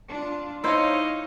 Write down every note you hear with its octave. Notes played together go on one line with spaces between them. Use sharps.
D4 F4
D#4 E4 C5 C#5 D#5 F5